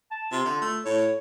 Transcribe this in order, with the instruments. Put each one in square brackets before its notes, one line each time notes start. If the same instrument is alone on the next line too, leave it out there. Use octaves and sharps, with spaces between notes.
[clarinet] A5
[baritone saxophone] C3 [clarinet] F4
[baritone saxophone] D3
A3
[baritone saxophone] A2 [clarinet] C#5